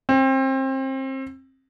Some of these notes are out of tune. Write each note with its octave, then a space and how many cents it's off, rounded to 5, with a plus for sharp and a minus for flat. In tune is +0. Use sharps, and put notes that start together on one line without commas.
C4 +30